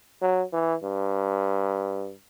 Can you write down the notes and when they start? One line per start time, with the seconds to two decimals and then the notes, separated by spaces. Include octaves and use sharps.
0.22 F#3
0.53 E3
0.83 G2